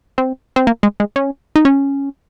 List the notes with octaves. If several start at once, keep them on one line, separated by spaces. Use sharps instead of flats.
C4
C4
A#3
G#3
G#3
C#4
D#4
C#4